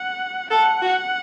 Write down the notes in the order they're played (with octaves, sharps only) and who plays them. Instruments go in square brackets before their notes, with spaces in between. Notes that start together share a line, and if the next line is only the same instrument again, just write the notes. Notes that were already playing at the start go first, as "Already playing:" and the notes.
Already playing: [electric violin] F#5
[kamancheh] A4 [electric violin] F#5
[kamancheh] F#4